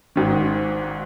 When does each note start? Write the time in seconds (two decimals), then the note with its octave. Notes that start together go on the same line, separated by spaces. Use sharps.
0.16 G#1 G#2 D#3